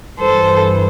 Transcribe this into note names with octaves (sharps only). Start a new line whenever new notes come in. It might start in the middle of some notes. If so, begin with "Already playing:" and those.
G2 E3 A4 C5